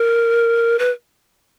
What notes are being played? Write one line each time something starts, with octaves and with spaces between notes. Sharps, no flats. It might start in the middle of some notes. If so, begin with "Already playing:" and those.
Already playing: A#4
B4